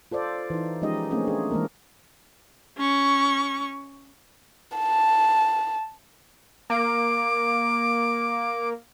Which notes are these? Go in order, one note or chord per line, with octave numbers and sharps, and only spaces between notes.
F4 A4 C5 D5
E3 D#4
F3 G#3 C#4 D#4 G4 D#5
A3 A#3 C4 C#4 G#4
D4 G#4
E3 G#3 A#3 A#4
C#4 C#6
A5
A#3 D6